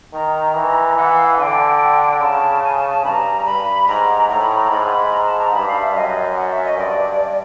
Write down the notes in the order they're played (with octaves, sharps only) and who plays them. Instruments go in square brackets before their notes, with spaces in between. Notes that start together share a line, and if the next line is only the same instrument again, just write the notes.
[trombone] D#3 [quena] A#5
[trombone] E3
[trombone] E3 [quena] F#5
[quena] F5
F#5
[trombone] D3 [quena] G#5
[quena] G5
[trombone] C#3 [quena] A5 A#5
[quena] G#5
A5
A5
[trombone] G2 [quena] A#5 B5
[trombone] G2 [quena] B5
[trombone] G#2 [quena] A#5
[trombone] A2 [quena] A#5
[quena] B5
A#5
A#5
[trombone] G#2 [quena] B5
[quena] B5
A#5
A5
A#5
[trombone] G2 [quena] B5
[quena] F5
E5
[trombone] F#2 [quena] D#5
[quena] D#5
F#5
E5
D#5
[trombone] G2 [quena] D5